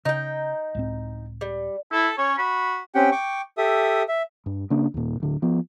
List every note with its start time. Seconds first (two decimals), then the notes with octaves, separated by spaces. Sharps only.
0.05 C#3 D#4 G5
0.75 C#2 A2 C4
1.41 G3
1.93 E4 A4
2.18 C#4 C#5
2.38 F#4 B5
2.95 C4 C#4 G4 F#5 G5
3.12 G5 C#6 D6
3.58 G4 A4 E5 D#6
4.08 E5
4.46 G2
4.70 C#3 A#3 D4
4.94 D#2 A#2
5.20 D1 D3
5.42 F3 B3